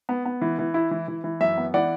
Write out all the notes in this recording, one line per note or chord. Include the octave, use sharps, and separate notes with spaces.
B3
B3
E3
E3
E4
E3
E3
E3
F#2 E5
B3
E3 D5 F#5